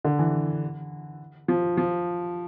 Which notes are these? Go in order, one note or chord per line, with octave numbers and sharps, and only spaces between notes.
D3
E3
F3
F3